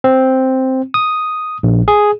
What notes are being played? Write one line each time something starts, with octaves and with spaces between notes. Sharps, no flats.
C4
D#6
A#1
G#4